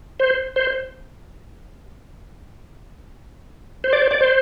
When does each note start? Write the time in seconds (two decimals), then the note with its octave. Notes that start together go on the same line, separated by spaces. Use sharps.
0.20 C5
0.56 C5
3.84 C5
3.93 D5
4.02 C5
4.11 D5
4.21 C5